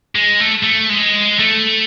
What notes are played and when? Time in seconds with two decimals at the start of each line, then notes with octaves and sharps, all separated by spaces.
0.15 G#3
0.40 A3
0.63 A3
0.89 G#3
1.39 A3